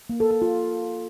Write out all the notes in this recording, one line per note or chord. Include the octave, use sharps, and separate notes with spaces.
A#3
A4
A4
F4